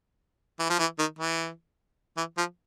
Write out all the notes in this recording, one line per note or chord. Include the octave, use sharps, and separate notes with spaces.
E3
F3
E3
D#3
E3
E3
F3